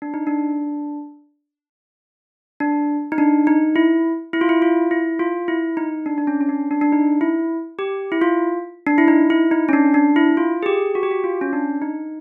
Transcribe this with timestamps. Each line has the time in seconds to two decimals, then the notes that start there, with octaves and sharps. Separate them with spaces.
0.02 D4
0.14 D#4
0.27 D4
2.60 D4
3.12 D#4
3.18 D4
3.47 D#4
3.76 E4
4.33 E4
4.41 F4
4.49 E4
4.62 F4
4.91 E4
5.19 F4
5.48 E4
5.77 D#4
6.06 D4
6.18 D4
6.27 C#4
6.41 C#4
6.49 D4
6.71 D4
6.81 D4
6.92 D#4
7.21 E4
7.79 G4
8.12 E4
8.21 F4
8.87 D4
8.98 E4
9.08 D#4
9.30 E4
9.51 D#4
9.69 C#4
9.73 D4
9.94 D4
10.16 E4
10.37 F4
10.63 G#4
10.66 G4
10.95 F#4
11.03 G4
11.11 F#4
11.24 F4
11.41 C#4
11.53 D4
11.82 D#4